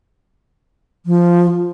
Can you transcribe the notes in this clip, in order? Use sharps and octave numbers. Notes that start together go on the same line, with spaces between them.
F3